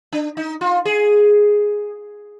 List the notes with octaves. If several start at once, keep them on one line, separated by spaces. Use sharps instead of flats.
D4
D#4
F4
G#4